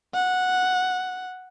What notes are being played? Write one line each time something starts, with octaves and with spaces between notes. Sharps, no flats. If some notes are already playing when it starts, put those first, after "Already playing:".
F#5